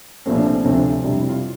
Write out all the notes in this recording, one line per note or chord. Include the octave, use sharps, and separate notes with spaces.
C2 A#2 F3 A3 C4
D4
C4
D4
D2 C3 F3 A3 C4
D4
F2 C3 G3 D4
E4
F4